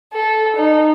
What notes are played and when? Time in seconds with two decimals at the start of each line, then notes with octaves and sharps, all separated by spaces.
0.13 A4
0.56 D#4